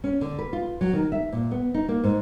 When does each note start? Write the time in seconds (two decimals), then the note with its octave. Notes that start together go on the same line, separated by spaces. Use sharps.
0.04 C#4
0.21 D3
0.39 B4
0.53 F4
0.81 F#3
0.93 D#3
1.12 E5
1.33 A#2
1.51 B3
1.74 D#4
1.88 A#3
2.04 G#2